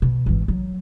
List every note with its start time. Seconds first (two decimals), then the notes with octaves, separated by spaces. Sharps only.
0.02 B2
0.26 G#1 E3
0.48 F#3